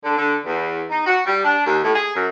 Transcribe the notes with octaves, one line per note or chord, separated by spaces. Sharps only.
D3
D3
E2
D#4
F#4
G3
D4
D#2
A2
G#4
F#2